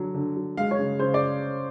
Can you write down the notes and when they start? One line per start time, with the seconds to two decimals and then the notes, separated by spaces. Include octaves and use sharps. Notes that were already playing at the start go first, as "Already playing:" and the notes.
Already playing: D3 F#3
0.14 D3
0.37 F#3
0.57 G#3 F5
0.71 C#5
0.79 C#3
0.99 C#3 C5
1.14 D5